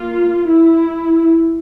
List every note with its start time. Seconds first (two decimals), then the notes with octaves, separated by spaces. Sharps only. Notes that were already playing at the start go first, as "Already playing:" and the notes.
Already playing: A#3 F4
0.48 E4